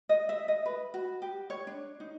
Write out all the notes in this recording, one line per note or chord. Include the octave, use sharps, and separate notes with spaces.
D#5
E5
D#5
B4
F#4
G4
C#5
D4
D#4